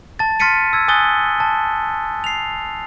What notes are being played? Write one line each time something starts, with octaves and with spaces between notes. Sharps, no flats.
A5 A6
C6 F6 A6 B6 C#7 D#7
E6 G#6
G#5 D#6 F#6 A6 G7
A5
C7 F7